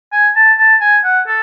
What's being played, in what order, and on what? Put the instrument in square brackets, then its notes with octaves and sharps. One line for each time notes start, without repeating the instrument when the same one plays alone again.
[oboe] G#5
A5
A5
G#5
F#5
A4